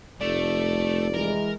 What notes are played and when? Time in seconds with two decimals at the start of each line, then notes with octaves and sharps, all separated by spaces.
0.21 F1 A3 D5
1.15 E3 G#3 A#4